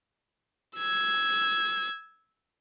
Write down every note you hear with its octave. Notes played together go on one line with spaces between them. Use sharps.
E6 G#6